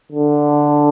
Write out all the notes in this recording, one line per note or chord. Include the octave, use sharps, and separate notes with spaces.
D3